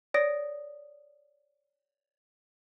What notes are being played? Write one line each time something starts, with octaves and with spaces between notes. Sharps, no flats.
C#5 D5 D#6 A#6 D7